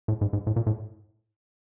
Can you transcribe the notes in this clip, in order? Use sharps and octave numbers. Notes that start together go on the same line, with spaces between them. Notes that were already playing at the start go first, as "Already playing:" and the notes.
A2
G#2
G#2
A2
A#2
A2